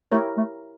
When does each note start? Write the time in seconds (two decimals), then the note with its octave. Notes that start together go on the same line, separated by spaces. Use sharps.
0.12 A3 E4 G4 A#4 C#5
0.37 A3